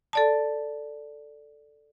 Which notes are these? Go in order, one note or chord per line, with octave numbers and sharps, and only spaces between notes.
A4 D5 A5